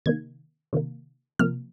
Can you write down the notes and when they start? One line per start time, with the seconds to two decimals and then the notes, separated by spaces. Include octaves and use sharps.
0.06 C3 D#3 A#3 G#6
0.73 C3 D#3 A#3
1.39 C3 F3 A#3 F6